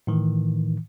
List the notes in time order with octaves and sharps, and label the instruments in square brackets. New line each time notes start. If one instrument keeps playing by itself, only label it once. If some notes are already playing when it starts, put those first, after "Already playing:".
[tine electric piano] A2 D#3 E3